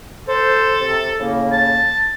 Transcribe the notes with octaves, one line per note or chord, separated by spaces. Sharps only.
A4 C5
C3
A2 C#3 A#3
A5